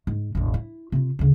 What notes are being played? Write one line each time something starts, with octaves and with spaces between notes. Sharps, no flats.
G#2
E1 A1
E4
C3 F4
D2 C#3